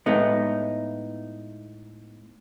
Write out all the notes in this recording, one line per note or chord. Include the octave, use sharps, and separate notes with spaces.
A2 G#3 A3 B3 D#4